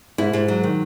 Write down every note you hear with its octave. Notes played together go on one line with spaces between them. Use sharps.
G#2 E4
G#2
F#3
D#3